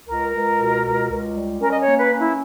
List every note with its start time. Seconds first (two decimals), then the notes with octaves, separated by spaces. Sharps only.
0.08 C#2 A#4
0.34 C#2
0.59 B2
0.84 C#2
1.10 C#2
1.35 G3
1.61 C#4 A#4
1.71 D#5
1.80 C#5
1.87 A#3
1.98 B4
2.12 C#4
2.19 E4